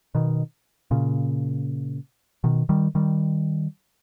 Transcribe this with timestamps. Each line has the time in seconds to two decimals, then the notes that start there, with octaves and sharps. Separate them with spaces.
0.15 B2 D#3
0.91 A#2 C#3
2.44 B2 D#3
2.69 D#3 G3
2.95 D#3 G3